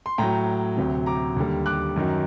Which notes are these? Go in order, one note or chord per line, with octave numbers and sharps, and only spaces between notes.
C6
A2 F#3 G5 A#5
D2 C3 F#3
A#5 D6
D#2 D3 G3
D6 F#6
F#2 D#3 F#3